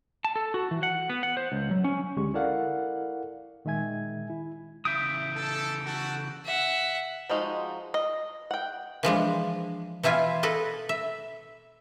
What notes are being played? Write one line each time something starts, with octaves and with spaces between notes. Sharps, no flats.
A5
A4
F#4
E3
F#5
B3
F#5
C5
C#2
F#3
C#4
C#2 D3 G#3 C#4 G4 C#6
E4 A4 A#4 D5 F5 F#5
A#2 D#3 G#3 E5 G#5 G#6
E4
C#3 E3 E5 D#6 G6 D7
A4
F#4 A4
E5 F#5
F3 G#3 D#4 F#4
D#5
F#5 G5
E3 F3 G#3 D4
B2 E3 E4 F4 G#5
A4 B4 D#5
E5